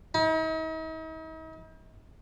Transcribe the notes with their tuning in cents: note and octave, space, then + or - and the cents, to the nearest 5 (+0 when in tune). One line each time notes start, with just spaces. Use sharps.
D#4 +45